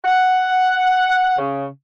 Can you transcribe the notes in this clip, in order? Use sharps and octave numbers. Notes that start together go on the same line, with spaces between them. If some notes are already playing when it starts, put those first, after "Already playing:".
F#5
C#3